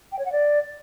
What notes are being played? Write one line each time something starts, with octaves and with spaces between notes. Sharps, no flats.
G5
C#5
F#5
D5